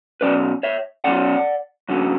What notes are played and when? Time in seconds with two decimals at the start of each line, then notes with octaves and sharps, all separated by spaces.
0.21 B2 F#3 C#4 B4 D5
0.63 C#5 E5
1.04 B2 F#3 C#4 D5 F#5
1.89 F#2 D3 F#3 C#4